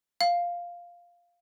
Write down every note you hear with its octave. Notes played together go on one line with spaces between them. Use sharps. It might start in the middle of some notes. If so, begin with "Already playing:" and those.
F5